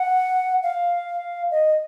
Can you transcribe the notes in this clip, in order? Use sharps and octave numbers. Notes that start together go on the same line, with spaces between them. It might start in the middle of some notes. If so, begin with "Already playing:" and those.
Already playing: F#5
F5
D#5